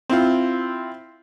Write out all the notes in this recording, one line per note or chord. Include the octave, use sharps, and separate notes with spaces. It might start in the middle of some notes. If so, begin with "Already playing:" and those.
C4 E4 F4